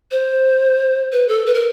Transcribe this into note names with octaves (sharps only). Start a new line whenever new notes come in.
C5
B4
A4
B4
A#4